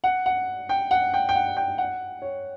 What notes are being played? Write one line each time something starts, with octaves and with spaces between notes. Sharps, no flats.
F#5
F#5
G5
F#5
G5
G5
F#5
G5
F#5
C#5